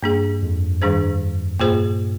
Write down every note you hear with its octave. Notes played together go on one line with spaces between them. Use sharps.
G2 A#3 D4 G#4
F2
G2 D#3 G3 D4 G#4 C5
G2 A#2 A#3 F4 G#4 C5